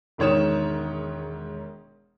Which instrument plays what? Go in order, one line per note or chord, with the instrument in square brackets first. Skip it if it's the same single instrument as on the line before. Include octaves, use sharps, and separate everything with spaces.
[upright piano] E1 G#2 D#3 C#5 D#6 E7